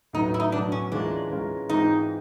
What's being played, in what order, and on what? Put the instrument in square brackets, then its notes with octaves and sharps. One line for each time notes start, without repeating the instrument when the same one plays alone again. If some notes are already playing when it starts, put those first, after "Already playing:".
[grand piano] A2 F#3 B3 [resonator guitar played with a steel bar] D#4
[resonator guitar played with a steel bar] E4
D#4
[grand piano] A2 F#3 B3 [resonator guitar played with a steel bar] D4
[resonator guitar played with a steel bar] C#4
[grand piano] E3 G#3 C#4 F4 A#4 [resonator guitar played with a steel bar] D4
[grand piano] E3 G#3 C#4 F4 A#4
[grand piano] G#2 E3 G#3 C4 F4 [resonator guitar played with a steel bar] D#4